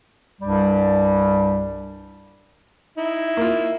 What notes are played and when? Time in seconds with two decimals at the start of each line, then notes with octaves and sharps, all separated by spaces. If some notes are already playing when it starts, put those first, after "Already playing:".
0.41 C2 G2 G3
2.98 D#4 E4
3.37 A#3 F4